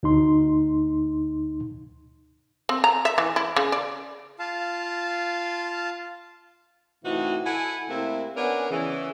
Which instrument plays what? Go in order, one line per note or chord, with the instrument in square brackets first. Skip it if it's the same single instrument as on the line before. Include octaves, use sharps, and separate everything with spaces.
[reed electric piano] D2 D#4 C6
[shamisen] C4
A#5
E5
E3
E4
C#3
D5
[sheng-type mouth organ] F4 F5 A5
[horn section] A2 C3 E3 D#4 F#4
E4 A4 F#5 G#5
C3 A3 A#3 C4 E4
B3 C#4 D4 A#4 F#5 G#5
C#3 E3